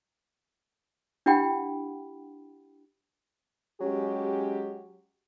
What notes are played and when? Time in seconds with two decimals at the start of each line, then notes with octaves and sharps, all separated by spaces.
1.26 D4 E4 G4 F#5 G5 B5
3.81 F#3 G#3 C#4 G4